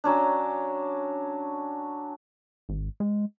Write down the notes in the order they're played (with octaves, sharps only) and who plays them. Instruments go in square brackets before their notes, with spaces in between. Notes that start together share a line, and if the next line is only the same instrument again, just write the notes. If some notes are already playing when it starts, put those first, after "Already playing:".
[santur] F#3 C#4 D4
[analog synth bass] G#1
G#3